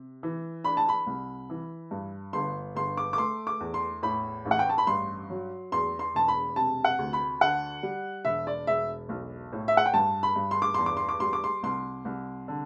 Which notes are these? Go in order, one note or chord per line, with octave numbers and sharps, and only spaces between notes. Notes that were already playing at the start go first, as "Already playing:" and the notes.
Already playing: C3
E3
D4 B5
A5
B5
C2
E3
G2
G1 C6
G1 C6
D6
D6
A3 C6
D6
E2
C6
A2 B5
A1
F#5
G5
A5
B5
G2 C6
F#3
E2 C6
C6
E1 A5
B5
C3 A5
F#5
D2
B5
D3 F#5
G3
E1 E5
D5
E1 E5
B1
A2
E5
F#5
G5
G2 A5
B5
G2
C6
D6
E2 C6
D6
C6
D6
G3 C6
D6
C6
C2 C6
C2
D3